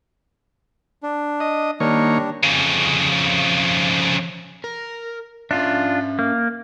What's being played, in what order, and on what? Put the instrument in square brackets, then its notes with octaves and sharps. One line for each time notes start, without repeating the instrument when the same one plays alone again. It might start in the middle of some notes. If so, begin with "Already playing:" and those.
[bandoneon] D4
[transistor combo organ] D#5
[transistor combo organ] D#3 A#3 C#5 [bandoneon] G3 D4
[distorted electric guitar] F2 C#3
[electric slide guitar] A#4
[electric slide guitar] C#4 E5 [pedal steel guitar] D4 F4
[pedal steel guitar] A#3